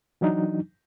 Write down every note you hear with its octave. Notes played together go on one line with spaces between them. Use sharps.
E3 F#3 D4 D#4